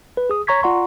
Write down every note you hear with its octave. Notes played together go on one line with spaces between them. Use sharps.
B4
G#4 D#6
C#5 A#5 C#6 G#6 B6
F4 D5 F#5 A#5 C6 C#6